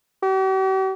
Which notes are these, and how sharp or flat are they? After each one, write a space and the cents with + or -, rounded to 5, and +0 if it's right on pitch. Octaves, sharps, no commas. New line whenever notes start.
G4 -45